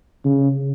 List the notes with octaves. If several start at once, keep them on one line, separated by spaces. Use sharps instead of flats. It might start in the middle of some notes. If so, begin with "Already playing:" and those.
C#3